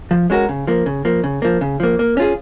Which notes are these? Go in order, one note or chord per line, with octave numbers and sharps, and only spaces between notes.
F3
G#3 C#4 F#4 A#4
C#3
F3 A#3
C#3
F3 A#3
C#3
F3 A#3
C#3
F3 A#3
A#3
C#4 F4 G#4